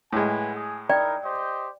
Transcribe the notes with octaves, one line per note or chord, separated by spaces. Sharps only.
A2 G#3 B4 F#5 G#5
G#4
D#4 E4 A#4 D5 G5
G4 C5 D#5